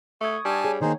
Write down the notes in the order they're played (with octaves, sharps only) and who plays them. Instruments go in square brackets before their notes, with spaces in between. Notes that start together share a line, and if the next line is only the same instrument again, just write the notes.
[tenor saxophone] A3 [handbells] C#6 D#6 G#6
[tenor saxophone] G3 [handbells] D4 [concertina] G#5 A5
[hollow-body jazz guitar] G#4 [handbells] C#5
[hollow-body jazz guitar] D#3 A#3 [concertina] D#4 G#4 C5